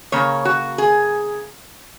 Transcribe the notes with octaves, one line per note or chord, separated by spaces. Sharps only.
C#3 A#3 C#5
F#4
G#4